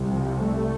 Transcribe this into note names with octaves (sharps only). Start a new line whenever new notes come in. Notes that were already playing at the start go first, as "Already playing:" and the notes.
Already playing: C2 C3
F3
A3